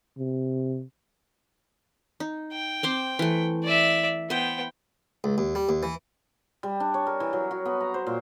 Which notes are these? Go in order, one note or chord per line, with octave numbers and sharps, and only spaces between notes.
C3
D#4
G5
C4 C5 D6
E3 A3
D5 E5
B3 B4 C5 G5
C#2
D#2
G3
D#2
E3
G3
D4
C#5
A#4
E3
F#3
F#4
B3
A#5
C5
A#2